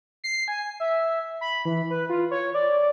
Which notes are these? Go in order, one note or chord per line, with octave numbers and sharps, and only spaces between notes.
C7
G#5
E5
B5
E3
B4
F4
C#5
D5